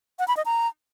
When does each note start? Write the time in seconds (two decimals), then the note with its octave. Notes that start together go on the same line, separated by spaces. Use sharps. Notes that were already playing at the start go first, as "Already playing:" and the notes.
0.19 F#5
0.28 B5
0.37 D#5
0.46 A#5